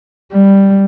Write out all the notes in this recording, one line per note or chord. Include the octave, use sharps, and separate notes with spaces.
G3